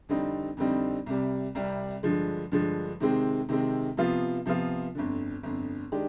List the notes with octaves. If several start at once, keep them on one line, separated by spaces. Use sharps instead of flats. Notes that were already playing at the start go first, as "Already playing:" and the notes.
F2 D3 G3 C4 D#4
F2 D3 G3 C4 D#4
C2 C3 G3
C2 C3 G3
G2 D3 F3 G#3
G2 D3 F3 G#3
C3 D#3 G#3 C4
C3 D#3 G#3 C4
C3 F3 B3 F4
C3 F3 B3 F4
G1 F2 D3
G1 F2 D3
D#3 G#3 D4 G4